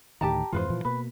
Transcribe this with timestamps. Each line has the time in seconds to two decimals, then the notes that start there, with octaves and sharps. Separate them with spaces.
0.21 D2 A2 D#3 G4 A5 A#5
0.52 F2 G#2 E3 F4 B4 C5
0.70 A#2 E3 F3
0.85 B2 A#3 B4